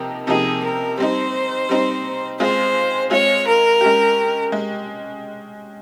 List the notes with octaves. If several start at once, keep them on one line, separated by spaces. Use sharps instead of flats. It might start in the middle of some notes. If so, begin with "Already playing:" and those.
Already playing: C3 F3 A#3 D#4 G4
C3 F3 A#3 D#4 G4 G#4
A#4
G3 C4 D#4 C5
G3 C4 D#4
G#3 C4 F4 G#4 C5
G#3 C4 F4 G#4 C#5
A#4
G#3 C#4 G4
G#3